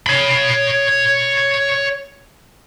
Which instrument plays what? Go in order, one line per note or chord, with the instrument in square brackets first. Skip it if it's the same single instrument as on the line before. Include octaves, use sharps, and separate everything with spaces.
[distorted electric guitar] C#5 B5